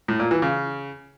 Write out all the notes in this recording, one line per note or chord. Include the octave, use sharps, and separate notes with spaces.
A2
A#2
E3
C#3